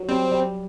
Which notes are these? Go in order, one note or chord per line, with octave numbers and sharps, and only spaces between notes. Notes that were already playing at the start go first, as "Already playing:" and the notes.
Already playing: F#3
G3 C4
G3